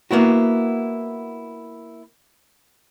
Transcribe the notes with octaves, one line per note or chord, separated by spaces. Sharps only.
A#3 B3 E4 F#4